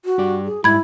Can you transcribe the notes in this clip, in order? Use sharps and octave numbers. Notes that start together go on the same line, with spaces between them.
F#4
G2 G4 D5
G#4
G#2 G3 E4 B5 G#6